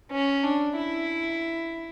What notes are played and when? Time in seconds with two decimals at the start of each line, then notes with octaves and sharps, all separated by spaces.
0.11 C#4
0.44 D4
0.76 E4